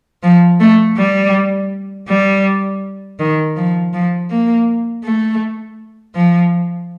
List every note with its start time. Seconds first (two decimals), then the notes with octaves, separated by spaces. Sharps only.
0.23 F3
0.60 A3
0.97 G3
2.08 G3
3.19 D#3
3.56 F3
3.93 F3
4.30 A#3
5.04 A3
6.15 F3